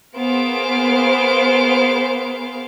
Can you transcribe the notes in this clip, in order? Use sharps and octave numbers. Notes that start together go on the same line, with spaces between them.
A#3 B3 G#4 C5 F5 D7